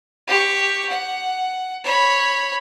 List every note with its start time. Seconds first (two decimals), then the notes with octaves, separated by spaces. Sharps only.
0.28 G4 C#6
0.89 F#5
1.84 C#5 B5